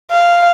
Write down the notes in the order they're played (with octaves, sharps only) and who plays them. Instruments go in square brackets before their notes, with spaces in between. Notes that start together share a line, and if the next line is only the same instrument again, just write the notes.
[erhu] F5